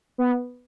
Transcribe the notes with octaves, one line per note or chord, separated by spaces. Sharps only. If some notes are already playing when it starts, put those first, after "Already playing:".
B3